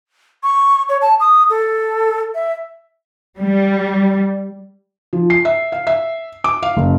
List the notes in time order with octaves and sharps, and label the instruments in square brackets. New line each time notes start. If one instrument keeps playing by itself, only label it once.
[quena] C#6
C#5
A5
D#6
A4
E5
[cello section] G3
[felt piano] F3
C7
E5
F5
E5
D6
F5
F#1